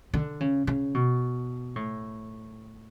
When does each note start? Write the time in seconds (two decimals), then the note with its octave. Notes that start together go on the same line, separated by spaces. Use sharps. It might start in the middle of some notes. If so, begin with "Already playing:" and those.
0.14 D3
0.40 C#3
0.67 C#3
0.94 B2
1.76 A2